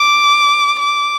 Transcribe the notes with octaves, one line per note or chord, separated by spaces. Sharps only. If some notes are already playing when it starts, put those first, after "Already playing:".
Already playing: D6
D6